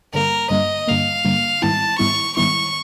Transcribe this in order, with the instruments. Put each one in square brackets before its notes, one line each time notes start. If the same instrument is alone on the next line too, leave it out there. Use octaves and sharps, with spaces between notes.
[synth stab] G2 D3 G3 A#3 [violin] A#4
[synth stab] G2 D3 G3 A#3 [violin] D#5
[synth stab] G2 D3 G3 A#3 [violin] F5
[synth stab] G2 D3 G3 A#3
[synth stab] G#2 D#3 G3 B3 E4 [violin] A5
[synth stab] G#2 D#3 G3 B3 E4 [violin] C#6
[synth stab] G#2 D#3 G3 B3 E4 [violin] C#6